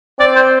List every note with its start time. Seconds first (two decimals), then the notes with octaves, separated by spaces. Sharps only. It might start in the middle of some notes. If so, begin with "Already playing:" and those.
0.19 C4 D5
0.36 C5